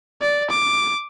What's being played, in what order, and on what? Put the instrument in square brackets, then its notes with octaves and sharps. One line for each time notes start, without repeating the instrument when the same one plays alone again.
[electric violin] D5
D6